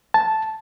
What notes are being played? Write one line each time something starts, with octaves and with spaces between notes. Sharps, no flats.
A5